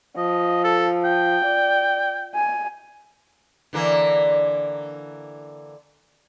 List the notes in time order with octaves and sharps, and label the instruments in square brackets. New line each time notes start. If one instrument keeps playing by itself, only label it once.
[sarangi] F3 [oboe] D#5
[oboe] A4
G5
[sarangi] D5
G#5
[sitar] D3 E3 A#3